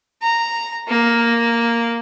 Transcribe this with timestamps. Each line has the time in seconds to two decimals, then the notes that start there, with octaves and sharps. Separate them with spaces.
0.22 A#5
0.88 A#3